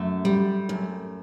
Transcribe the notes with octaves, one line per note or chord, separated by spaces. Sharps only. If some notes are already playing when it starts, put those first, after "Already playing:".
Already playing: F#2 A3
G3
F#2